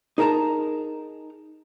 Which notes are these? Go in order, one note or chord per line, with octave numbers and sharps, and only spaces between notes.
D#4 G#4 A#4 D#5 A5 A#5